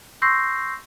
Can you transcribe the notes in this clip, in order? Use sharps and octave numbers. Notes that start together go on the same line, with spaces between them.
C6 C#6 E6 G6 A#6 C7